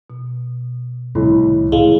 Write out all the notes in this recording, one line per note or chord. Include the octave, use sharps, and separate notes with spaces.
B2
C2 A2 D#3
A2 G#3 F5